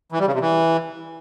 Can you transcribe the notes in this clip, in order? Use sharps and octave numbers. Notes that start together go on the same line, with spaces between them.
E3
G3
C#3
C3
E3